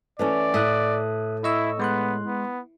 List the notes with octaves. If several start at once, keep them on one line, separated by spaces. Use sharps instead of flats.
E3 A3 C#4 D5
A2 E5 D#6 F#6
E4 D#5 C#6 E6
G#3 B3 C6 F#6
B3